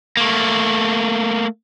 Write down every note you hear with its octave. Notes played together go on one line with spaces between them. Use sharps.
A3 A#3